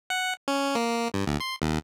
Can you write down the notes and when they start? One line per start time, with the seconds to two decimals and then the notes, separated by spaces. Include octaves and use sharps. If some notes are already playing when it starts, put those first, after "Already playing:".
0.10 F#5
0.48 C#4
0.75 A#3
1.14 G2
1.27 D2
1.40 C6
1.62 D#2